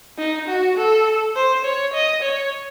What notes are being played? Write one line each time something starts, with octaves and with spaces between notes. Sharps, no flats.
D#4
F#4
A4
C5
C#5
D#5
C#5